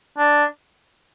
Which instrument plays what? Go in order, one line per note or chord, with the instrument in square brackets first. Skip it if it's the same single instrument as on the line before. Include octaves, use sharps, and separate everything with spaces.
[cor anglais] D4